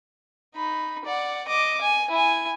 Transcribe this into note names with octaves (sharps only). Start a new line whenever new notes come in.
D#4 B5
D5 F#5
D#5 D6
G#5
E4 G#5